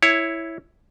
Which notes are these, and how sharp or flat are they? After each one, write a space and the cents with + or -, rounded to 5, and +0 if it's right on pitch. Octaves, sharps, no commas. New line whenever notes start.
E4 +0 C#5 +0